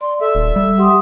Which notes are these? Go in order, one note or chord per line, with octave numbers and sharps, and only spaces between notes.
D5 C6
A4 E5
D#1
G3
G4 F#5 C6 D#6